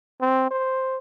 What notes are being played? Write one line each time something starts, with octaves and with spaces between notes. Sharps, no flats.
C4
C5